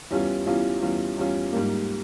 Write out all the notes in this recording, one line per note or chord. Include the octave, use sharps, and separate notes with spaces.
E2 E3 G3 C#4 F4
E2 E3 G3 C#4 F4
E2 E3 G3 C#4 F4
E2 E3 G3 C#4 F4
G#2 G3 A#3